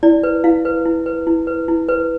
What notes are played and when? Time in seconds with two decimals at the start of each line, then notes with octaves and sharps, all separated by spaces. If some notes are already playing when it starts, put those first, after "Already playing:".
0.03 E4 D5
0.23 B4
0.44 E4 F5
0.65 B4
0.86 E4
1.06 B4
1.27 E4
1.47 B4
1.68 E4
1.88 B4